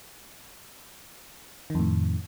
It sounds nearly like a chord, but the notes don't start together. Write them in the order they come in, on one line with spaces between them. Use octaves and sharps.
D#3 F2 A2